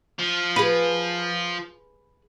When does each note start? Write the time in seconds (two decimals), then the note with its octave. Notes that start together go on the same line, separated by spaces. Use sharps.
0.19 F3
0.56 G#4 B4